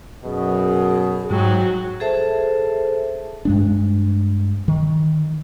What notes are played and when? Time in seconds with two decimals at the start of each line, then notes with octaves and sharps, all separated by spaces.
0.24 F#2 B2 G#4
1.31 G#2 F#3 G5
2.00 G#4 A4 C5 E5 A5
3.45 G2 G#3 D4
4.68 D#3